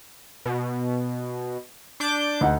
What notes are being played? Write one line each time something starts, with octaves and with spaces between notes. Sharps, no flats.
B2
D4 D6 G6
D2 D#4 F#5